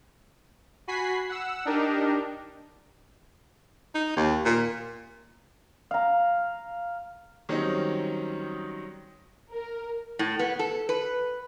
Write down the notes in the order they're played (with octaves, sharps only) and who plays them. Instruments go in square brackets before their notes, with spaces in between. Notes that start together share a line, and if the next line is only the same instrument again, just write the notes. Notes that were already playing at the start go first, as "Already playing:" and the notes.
[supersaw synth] F#4 G#5 B5 B6 C7
F#5 E6
D4 D#4 G4 A#4
[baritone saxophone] D#4
D#2
A#2
[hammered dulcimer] F5 A#5
[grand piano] D#3 F#3 G3 C4 C#4 D#4
[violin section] A#4
[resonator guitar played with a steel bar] A2
B3
A4
B4